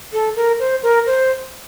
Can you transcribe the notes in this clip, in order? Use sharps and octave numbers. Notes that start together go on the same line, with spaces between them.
A4
A#4
C5
A#4
C5